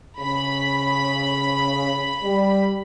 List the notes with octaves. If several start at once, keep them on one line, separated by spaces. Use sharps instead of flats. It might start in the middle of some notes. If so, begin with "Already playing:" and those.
C#3 B5
G3